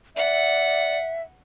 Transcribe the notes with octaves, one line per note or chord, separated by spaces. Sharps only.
D5 E5 F#5